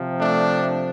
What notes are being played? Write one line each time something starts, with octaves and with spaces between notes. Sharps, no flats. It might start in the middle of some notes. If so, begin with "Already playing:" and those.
Already playing: C3 F3
A3 D4